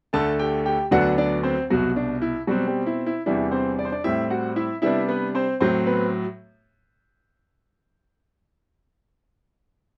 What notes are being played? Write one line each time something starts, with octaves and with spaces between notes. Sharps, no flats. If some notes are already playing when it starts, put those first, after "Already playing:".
D2 D3 A3 A4 A5
G4 G5
G4 G5
D2 D3 F#3 B3 D4 F#4 F#5
D4 D5
C4 C5
C2 B2 F#3 F#4
D4
E4
B2 F#3 G3 C4 F#4
G3 G4
E4
E4
E2 C3 E3 G3 D4 E4
C4 C5
D5
C5
D4 D5
A2 G3 C4 E4 E5
F#4 F#5
E4 E5
C3 G3 B3 D4 E4 E5
B3 B4
C4 C5
A2 F#3 C4 C5
B3 B4